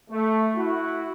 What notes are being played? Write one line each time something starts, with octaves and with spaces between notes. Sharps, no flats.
A3
E4 F#4